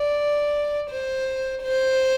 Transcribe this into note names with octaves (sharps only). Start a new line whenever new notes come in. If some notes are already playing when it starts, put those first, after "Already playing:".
Already playing: D5
C5
C5